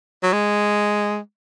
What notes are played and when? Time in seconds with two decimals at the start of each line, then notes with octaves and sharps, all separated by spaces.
0.23 F#3
0.33 G#3